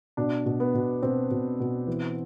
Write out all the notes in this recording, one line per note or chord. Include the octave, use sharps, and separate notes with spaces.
B2 D4
B2
B3
B2
B2 C4
B2
B2
E3